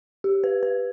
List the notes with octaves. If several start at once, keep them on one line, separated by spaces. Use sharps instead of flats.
G4
B4
B4